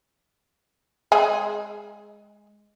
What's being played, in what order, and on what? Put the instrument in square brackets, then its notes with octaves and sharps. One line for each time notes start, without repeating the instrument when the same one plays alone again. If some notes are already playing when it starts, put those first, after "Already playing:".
[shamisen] G#3 G#4